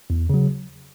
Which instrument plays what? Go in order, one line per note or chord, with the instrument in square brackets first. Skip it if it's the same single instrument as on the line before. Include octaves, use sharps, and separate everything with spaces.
[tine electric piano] E2
C#3 F#3